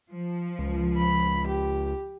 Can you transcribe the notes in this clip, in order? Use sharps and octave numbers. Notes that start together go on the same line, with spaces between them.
F3
C#2
B5
G4